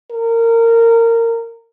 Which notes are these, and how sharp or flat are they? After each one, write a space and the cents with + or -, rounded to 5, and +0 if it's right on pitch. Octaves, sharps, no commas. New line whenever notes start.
A#4 -20